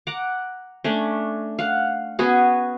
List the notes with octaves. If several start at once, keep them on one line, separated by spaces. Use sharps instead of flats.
F#5 A#5 D6
A3 C#4 D4
F5 F#5
B3 C#4 F#4 G#4